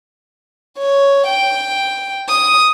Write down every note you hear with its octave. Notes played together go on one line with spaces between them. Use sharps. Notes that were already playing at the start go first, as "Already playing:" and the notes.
C#5
G5
D#6